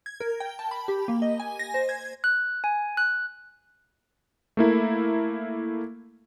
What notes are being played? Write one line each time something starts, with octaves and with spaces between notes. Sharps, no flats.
G#6
A#4
G5
A5
B5
G4
A#3
D#5
G#5
A#6
C5
G#6
F#6
G#5
F#6
A3 A#3 E4 A#4